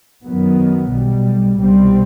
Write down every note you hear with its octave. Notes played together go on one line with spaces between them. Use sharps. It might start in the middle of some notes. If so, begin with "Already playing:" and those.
F#2 D#3 F#3 B3
B1 B2 G3
C2 B2 G3 C4